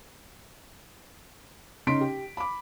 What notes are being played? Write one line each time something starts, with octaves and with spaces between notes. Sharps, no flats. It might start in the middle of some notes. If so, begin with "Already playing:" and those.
C#3 C#4 D#4 C6 B6 D7
G4
B5 D6